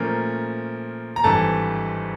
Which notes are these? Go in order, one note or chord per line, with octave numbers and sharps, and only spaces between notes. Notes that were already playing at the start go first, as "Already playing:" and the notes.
Already playing: A#2 F3 A3 C#4 A#4
A#5
G#1 G2 E3 A4 A5